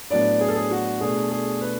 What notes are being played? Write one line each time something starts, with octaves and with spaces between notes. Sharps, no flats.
A2 F#3 B3 D4 D5
G#4
A4
G#4
F#4
B2 A3 D4 G#4
G#4
B4